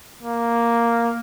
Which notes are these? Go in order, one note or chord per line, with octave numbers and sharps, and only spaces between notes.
A#3